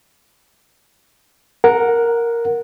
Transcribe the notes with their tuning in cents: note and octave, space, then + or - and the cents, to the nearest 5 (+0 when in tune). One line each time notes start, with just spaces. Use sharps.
A#4 +0 F#5 -15